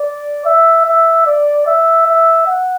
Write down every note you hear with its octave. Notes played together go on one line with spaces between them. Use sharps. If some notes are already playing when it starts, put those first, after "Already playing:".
Already playing: D5
E5
E5
D5
E5
E5
F#5